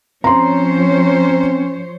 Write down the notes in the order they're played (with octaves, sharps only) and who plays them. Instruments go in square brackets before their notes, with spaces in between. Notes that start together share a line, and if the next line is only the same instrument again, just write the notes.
[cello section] F3 C5 C#5 [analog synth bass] C4 [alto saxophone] C#4 [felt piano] A#5 C6